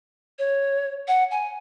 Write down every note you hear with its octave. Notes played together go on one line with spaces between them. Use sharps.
C#5
F#5
G#5